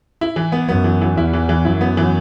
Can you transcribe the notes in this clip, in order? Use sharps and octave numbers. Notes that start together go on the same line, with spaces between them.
E4
E3
B3
F#2 B3
E3
E3
E2 E4
E3
E3
F#2 E4
B3
E3